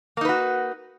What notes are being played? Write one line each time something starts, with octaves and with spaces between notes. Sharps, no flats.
A#3 D#4 F#4 B4